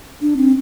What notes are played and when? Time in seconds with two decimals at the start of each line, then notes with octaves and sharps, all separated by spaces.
0.22 D4
0.37 C4